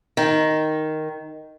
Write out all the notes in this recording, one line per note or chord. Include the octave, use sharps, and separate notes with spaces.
D#3